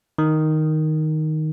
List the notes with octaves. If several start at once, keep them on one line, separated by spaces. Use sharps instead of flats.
D#3